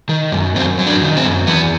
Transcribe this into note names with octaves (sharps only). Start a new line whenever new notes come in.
D#3
F#2
F#2 C4
F#3
D4
D#3
C4
F#2
E2 B3